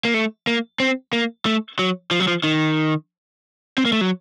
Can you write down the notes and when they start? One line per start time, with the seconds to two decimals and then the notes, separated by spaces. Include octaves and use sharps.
0.05 A#3
0.14 A3
0.47 A#3
0.80 C4
1.13 A#3
1.46 A3
1.79 F#3
2.11 F3
2.20 F#3
2.28 F3
2.44 D#3
3.78 C4
3.85 A#3
3.93 A3
4.01 F#3